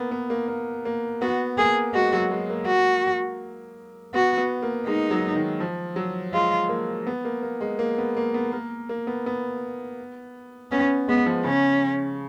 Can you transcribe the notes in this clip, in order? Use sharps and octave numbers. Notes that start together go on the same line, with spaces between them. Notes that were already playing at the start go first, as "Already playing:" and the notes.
Already playing: A#3 B3
B3
A#3
A#3
A#3
B3 F#4
A#3 G#4
G#3 F#4
F#3
G#3
A#3
F#4
B3 F#4
B3
A#3
G#3 D#4
F#3
D#3
F3
F#3
G#3 F4
A#3
B3
A#3
A#3
G#3
A#3
B3
A#3
B3
A#3
A#3
B3
B3
B3 C#4
G#3 B3
F3
C#3 C#4